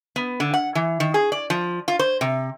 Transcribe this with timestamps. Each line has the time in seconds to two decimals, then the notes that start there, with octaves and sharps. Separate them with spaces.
0.16 B3
0.40 D3
0.54 F#5
0.75 E3
1.00 D#3
1.14 G#4
1.32 D5
1.50 F3
1.88 F4
1.99 C5
2.21 C3